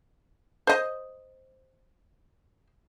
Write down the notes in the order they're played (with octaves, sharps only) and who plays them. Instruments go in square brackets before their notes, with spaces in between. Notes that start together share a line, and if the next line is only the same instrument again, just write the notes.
[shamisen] C5 D#5